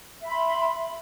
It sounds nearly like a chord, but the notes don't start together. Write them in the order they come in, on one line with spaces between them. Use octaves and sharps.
E5 B5 C6